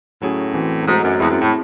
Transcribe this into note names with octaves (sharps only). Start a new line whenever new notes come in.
A2 F#3 C#4 G#4
E3 C4 F#4
F#2
G#2 F#3 A3 D#4 F#4 C5
F#2
E2 G#3 C4 E4
F#2
A2